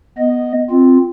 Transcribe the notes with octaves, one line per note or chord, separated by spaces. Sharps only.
B3 D#5
C4 F4